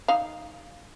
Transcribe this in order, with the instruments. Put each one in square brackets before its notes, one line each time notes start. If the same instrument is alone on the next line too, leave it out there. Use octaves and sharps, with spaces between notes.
[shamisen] D#4 F5